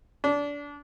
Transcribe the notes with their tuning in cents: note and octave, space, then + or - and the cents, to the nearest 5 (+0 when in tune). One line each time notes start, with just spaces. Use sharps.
D4 -25